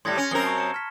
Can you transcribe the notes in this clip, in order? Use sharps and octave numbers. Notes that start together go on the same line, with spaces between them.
A2 G3 C6 G#6 A#6
C#4 G#6 A#6
F#2 C4 A#4 G7
A5 A#5 C#6
C#7 E7
F6 B6